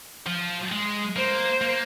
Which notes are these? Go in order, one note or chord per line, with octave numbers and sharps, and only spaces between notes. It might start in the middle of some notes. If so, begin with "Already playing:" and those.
F3
G#3
A#3 C5
A#3